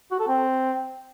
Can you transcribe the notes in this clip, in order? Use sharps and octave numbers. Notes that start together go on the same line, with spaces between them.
F#4
A4
C4